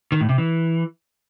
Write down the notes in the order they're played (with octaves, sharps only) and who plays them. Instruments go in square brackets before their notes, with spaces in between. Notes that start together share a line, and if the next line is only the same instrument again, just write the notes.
[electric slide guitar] D#3
A2
C3
E3